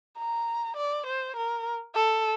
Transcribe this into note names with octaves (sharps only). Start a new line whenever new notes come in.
A#5
D5
C5
A#4
A4